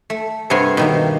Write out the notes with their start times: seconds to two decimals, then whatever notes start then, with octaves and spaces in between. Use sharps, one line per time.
0.10 A3
0.50 G2 C3 B3 A#4 C#5 C6
0.77 B2 D#3 A#3